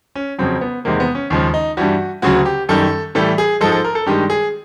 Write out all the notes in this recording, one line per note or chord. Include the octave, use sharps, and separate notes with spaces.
C#4
F2 C#3 F#3 C4
B3
E2 C3 D#3 G#3 A#3
B3
C#4
D#2 C#3 F3 G#3
D#4
G2 E3 G3 F#4
D2 C#3 F#3 F#4
G4
F#2 D#3 G3 A4
A2 E3 G3 A4
G#4
G#2 F3 G#3 A4
A4
A#4
A4
G2 D#3 G#3 G4
G#4